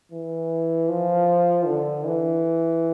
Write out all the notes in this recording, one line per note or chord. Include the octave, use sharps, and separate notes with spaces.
E3
F3
D3
E3